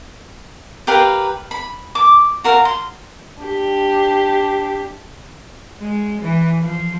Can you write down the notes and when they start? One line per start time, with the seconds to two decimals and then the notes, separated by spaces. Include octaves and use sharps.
0.87 G4 A#4 B4 F5
1.51 B5
1.95 D6
2.44 F#4 A#4 F5
2.65 C6
3.42 D4 G4
5.80 G#3
6.21 E3
6.62 F3